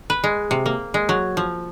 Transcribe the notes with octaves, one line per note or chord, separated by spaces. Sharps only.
B4
G#3
C3
A#3
G#3
F#3
F3